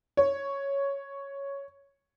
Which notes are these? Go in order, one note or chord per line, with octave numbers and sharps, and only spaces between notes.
C#5